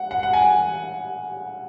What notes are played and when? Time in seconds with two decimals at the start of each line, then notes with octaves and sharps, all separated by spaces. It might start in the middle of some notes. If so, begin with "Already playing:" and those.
Already playing: F#5
0.11 F#5
0.23 F#5
0.33 G#5